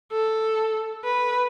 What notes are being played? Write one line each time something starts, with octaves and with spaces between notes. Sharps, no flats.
A4
B4